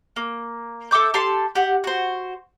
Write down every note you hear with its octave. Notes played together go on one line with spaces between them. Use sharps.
A#3
A4 E5 D6 G6
G4 A4 A5 C6
G4 F#5
F#4 C5